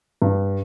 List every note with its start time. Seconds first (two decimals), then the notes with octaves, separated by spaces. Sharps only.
0.22 G2